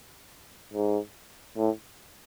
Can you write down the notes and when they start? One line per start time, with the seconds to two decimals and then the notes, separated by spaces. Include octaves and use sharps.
0.73 G#2
1.57 A2